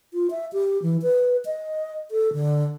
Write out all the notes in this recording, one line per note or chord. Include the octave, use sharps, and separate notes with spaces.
F4
E5
G4
E3
B4
D#5
A4
D3